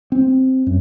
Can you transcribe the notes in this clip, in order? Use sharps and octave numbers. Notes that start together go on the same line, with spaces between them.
C4
F#2